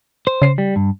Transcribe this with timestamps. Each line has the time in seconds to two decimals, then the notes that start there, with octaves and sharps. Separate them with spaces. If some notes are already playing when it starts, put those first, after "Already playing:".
0.27 C5
0.42 C#3 C7
0.58 G3
0.76 G2